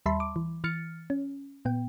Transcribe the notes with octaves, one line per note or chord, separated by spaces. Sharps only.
D#2 G3 E5 A5 B5 C6
D6
E3
E3 F6 A6 C#7
C#4
A#2 B3 G5